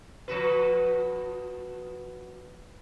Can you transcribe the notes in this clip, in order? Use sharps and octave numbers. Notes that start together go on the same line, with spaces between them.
F3 F#4 B4